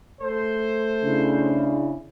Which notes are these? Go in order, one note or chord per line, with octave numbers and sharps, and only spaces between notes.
A3 A4 C5
C#3 D4 E4